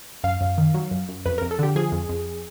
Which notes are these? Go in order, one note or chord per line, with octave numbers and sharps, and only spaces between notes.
F#2 F5
F#2
D#3
F#3
F#2
F#2
F2 B4
F2 A#4
A4
D3 G4
F3 G#4
F2
F2